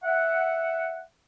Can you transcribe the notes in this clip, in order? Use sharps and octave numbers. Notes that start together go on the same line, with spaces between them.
E5 F#5